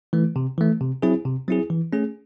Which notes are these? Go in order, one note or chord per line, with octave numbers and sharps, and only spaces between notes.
E3 A3
C3
E3 A3
C3
F#3 C4 E4 G#4
C3
F#3 C4 E4 G#4
E3
A3 C#4 G#4